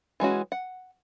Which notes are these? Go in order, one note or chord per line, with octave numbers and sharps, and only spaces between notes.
E3 G#3 C#4 F#4
F#5